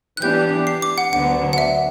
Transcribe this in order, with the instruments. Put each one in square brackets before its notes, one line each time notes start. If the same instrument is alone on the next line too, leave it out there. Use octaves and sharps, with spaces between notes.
[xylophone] F#6
[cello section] E3 B3 D4 G4 [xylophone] G6
[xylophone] C7
D6
F#5
[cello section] D2 D3 F#3 B3 D4 [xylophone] F#5
[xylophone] F#5
E5